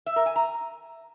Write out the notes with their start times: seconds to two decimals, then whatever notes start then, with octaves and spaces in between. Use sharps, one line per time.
0.06 E5
0.16 A#4
0.26 G#5
0.36 A#5